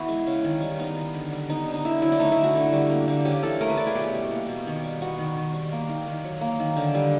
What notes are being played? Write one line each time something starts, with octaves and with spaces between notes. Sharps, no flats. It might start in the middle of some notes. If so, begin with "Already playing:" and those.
Already playing: E3 B3 E4 F#4
G#3
C#3
D#3
G3
B3 D#4
D#3
D3
G3
B3 D#4
D3
D#4
D3 E4
F#3 E4
D4
A3 D#4
E4
D3
F#4
D3
G3
A#3
D3
C#3 G4
E3 A4
A3 A#4
B4
C#3 D5
G#4
B2 G4
G3
A#3
B2
D#3
G3
B3 F#4
D#3
D#3
G3
A#3
D#3
D#3
F#3
A#3
D#3
D3
G3